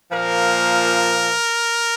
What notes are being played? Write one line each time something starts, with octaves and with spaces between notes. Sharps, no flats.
A#2 F3 A#3 A#4